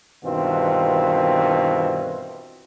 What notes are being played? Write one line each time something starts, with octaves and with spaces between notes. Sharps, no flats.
G2 B2 D#3 E3 C4 F4